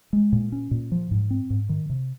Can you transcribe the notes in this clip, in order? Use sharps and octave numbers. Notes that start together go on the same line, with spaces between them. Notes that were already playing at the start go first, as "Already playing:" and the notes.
G#3
A#2
C#4
A#2
F3
G#2
C4
G#2
D#3
C3